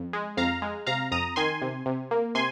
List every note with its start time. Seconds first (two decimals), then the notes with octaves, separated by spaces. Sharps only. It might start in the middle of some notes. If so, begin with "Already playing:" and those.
Already playing: F2
0.13 G#3
0.37 F2 F5 A#5
0.62 G#3
0.86 C3 F5 A#5
1.12 F2 A#5 D#6
1.36 D#3 G#5 C6
1.62 C3
1.86 C3
2.11 A#3
2.35 C3 G#5 C6